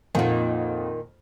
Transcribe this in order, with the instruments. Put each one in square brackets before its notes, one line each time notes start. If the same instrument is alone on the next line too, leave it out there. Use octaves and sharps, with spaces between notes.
[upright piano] F2 F4 F#5 [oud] A#2 D#3